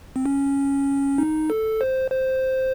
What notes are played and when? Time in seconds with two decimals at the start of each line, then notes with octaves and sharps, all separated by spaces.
0.16 C4
0.26 C#4
1.18 D#4
1.50 A4
1.81 C5
2.11 C5